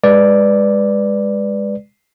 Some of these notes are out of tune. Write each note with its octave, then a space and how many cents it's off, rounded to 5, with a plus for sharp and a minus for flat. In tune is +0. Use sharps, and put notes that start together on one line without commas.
G#3 -20 B4 +0 D5 +0